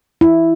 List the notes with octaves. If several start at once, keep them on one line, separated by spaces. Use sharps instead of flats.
E4